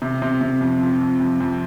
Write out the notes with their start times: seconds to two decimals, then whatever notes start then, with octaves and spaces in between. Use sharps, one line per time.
0.02 C3
0.22 C3
0.41 C3
0.61 F2
0.82 F3
1.01 F2
1.20 F2
1.40 F2